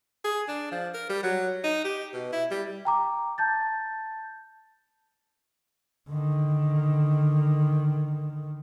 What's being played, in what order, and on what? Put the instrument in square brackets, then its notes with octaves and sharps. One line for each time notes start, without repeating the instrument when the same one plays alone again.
[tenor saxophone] G#4
D4
F3
A#4
G3
F#3
D#4
G4
B2
E4
G3
[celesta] G5 A#5 D6
A5 G6 A6
[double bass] D3 D#3